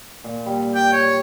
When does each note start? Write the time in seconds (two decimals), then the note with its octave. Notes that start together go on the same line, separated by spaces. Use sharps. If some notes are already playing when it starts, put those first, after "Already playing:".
0.24 A#2
0.46 G3
0.75 G5
0.92 C#5